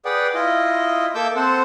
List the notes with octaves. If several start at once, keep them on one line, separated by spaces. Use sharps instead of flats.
G#4 B4 D5 F#5 G5
E4 F4 D#5
A#3 A4 E5 D6 E6 G6
C4 A4 C5 F#5